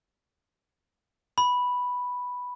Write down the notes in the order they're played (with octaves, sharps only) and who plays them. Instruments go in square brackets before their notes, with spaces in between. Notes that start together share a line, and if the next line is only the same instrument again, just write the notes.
[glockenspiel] B5